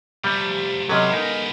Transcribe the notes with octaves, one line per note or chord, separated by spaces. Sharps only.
C3 G3 A3
C3 F#3 G#3 B3 A4 D#5 F6
D#4 A#4